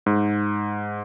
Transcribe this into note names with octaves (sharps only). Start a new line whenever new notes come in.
G#2